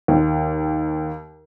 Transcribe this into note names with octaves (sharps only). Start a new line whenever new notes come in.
D#2